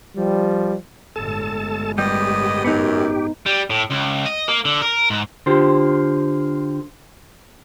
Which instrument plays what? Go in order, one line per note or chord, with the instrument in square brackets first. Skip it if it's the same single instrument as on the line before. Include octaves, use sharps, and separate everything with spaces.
[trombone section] F3 G3
[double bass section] G1 A2 G#3 [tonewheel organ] A4 A5
[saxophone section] F#2 B3 D#5 [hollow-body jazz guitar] G3 [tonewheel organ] G4
[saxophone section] F#2 [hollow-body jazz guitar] B3 D#4
[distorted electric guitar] G3
A2
C#2
D#5
A#3
D3
A#4
G#2
[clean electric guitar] D3 F4 G4 C5